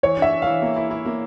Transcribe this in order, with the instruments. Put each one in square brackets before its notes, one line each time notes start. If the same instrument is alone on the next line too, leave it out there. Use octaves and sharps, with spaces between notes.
[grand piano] E3 [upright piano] C#5
[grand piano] D4
[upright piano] E5
[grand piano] D4
[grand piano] E3 [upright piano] F5
[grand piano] A#3
E4
E4
A#3